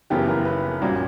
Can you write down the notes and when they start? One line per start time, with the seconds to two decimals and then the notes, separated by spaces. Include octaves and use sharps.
0.10 F#1 F#2 C#3 E3 B3 G4
0.29 A#4
0.45 B4
0.81 A#1 A#2 G3 A#3 C#4 F#4